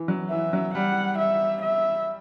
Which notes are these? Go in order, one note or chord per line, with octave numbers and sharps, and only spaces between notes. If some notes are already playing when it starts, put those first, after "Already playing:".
Already playing: E3
F#3
E3 E5
F#3
G3 F#5
E5
E5